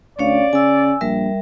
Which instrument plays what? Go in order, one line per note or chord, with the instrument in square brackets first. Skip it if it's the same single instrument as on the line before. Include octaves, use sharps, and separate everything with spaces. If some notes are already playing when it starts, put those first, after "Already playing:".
[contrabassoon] D2 [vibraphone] C#4 C#5 F5 [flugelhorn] D5
[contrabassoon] C#3 [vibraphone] G#5 E6
[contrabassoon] A#1 [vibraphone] G3 A#4 E5